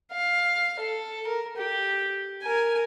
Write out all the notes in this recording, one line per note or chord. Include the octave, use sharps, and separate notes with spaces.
F5
A4
A#4
G4
A#4 G#5